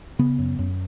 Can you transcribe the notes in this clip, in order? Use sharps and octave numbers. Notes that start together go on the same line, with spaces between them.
C#3 B3
F#2
F#2